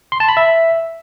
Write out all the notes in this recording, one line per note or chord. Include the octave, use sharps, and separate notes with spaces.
C6
A5
B5
E5